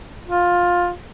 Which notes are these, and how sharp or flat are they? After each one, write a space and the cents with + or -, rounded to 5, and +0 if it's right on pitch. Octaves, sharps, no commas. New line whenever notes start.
F4 +15